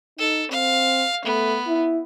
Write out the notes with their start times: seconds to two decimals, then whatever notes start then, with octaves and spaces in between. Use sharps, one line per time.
0.18 D#4 A4
0.51 C4 F5
1.25 A3 B3
1.67 E4